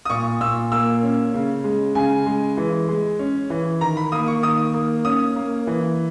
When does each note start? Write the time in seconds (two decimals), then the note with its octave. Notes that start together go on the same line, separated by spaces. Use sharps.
0.05 D#6
0.10 A#2 C#6
0.41 A#2 E6
0.72 A#3 E6
1.03 C#4
1.34 C#3
1.64 G#3
1.95 C#3 G#5
2.26 G#3
2.57 E3
2.89 G#3
3.19 C#4
3.50 E3
3.81 D#3 A#5
3.97 B5
4.12 A#3 D#6
4.28 C#6
4.43 D#3 D#6
4.73 A#3
5.05 C#4 D#6
5.36 A#3
5.67 E3